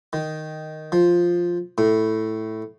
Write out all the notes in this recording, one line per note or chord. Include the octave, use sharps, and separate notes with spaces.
D#3
F3
A2